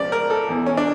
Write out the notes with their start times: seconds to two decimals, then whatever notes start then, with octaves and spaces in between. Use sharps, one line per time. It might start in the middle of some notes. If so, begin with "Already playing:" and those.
Already playing: C#2 C#3 F3 D5
0.12 A#4
0.30 A4
0.49 E2 E3
0.66 C#4
0.77 D4